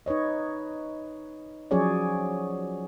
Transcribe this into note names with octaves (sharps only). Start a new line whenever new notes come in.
D#4 B4 C#5 D#5
F3 F#3 C#4 G#4 C#5 D5